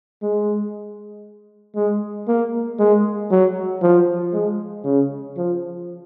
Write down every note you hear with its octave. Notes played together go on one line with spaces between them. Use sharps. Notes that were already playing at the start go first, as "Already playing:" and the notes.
G#3
G#3
A#3
G#3
F#3
F3
G#3
C#3
F3